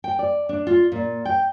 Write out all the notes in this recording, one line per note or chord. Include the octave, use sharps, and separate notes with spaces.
G5
D5
D4
F4
A#2
G5